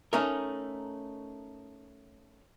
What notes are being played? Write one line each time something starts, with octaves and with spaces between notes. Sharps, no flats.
A3 C#4 D#4 A#4